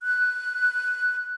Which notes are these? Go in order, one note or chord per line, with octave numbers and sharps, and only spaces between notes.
F#6